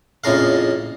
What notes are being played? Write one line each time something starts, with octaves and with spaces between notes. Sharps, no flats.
A#1 F2 A2 C#3 A#4 F5